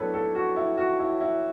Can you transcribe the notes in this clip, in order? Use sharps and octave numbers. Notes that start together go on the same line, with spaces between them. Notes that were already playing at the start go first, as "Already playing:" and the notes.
Already playing: A2 F#3 B3 D4 A4 B4 C#5
A4
F#4
E4
F#4
E4
E4